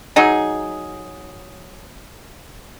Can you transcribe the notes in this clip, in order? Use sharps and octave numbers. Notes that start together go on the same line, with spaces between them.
F#3 D#4 G#4